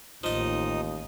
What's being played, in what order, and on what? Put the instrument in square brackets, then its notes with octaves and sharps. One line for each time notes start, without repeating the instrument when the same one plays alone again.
[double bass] A1 [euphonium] D#2 [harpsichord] F3 D#5 [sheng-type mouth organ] D#4 D#6